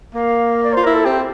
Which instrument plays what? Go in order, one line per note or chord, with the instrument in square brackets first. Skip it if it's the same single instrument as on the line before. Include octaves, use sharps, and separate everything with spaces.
[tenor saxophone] A#3 [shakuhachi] F5
[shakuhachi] D5
[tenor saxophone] F4 [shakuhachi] C5
[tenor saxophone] E4 [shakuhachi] A#4
[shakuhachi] A4
[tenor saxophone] C4 [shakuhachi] G4